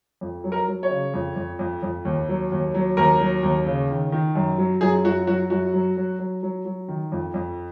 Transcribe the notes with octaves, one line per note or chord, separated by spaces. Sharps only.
F2
F#3
A#4
F#3
C#5
C#3
F2
F2
F2
F2
D#2
F#3
D#2
F#3
D#2 A#4
F#3
D#2
C#3
D#3
D#3
F#2
F#3
F#2 G#4
F#2 F#4
F#3 F#4
F#2 F#4
F#3
F#3
F#3
F#3
F#3
D#3
F2
F2